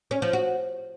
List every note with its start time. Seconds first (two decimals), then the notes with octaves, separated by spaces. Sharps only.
0.11 C#4
0.22 F3
0.33 F#4